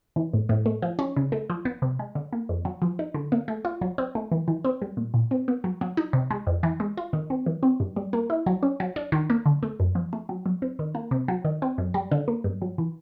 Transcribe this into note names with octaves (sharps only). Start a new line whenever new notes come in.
E3
A2
A2
A3
F3
C#4
C#3
A3
F3
B3
C3
G#3
D3
A#3
F2
F#3
F3
D#4
D3
A#3
A3
F4
F#3
C4
A3
E3
E3
C4
G3
A#2
A#2
C4
B3
F#3
F#3
D#4
C3
G#3
F2
E3
G#3
F4
D#3
C4
E3
C4
G2
G3
A#3
E4
F#3
C#4
F#3
D4
D#3
A#3
D3
A3
F#2
F3
A3
F#3
F#3
C4
D#3
A#3
C3
F#3
D#3
C4
F#2
G3
D3
A#3
G2
F#3
E3